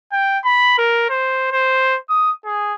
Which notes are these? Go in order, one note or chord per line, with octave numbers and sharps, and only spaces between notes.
G5
B5
A#4
C5
C5
D#6
G#4